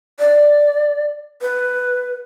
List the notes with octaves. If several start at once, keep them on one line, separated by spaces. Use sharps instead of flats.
D5
B4